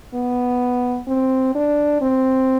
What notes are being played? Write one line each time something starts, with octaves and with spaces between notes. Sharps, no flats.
B3
C4
D4
C4